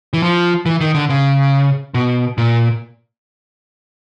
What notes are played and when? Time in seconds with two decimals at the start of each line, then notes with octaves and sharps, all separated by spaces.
0.13 E3
0.23 F3
0.66 E3
0.81 D#3
0.95 D3
1.09 C#3
1.94 B2
2.38 A#2